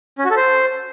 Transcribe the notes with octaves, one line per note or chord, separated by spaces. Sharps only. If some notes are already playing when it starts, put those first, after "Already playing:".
C#4
F#4
A4
C5